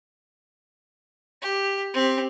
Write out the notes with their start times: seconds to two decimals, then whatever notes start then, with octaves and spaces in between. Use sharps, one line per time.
1.42 G4
1.94 C4 G4